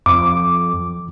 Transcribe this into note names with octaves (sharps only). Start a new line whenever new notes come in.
F2 D6